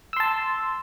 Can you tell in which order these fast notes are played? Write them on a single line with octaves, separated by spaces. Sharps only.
E6 C6 A5